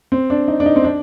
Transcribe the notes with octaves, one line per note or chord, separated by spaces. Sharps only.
C4
D4
D#4
D4
D#4
C4
D4